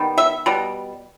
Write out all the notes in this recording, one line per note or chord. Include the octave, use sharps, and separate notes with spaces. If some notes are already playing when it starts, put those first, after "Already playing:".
Already playing: D#3 G3 B3
E5
B2 G3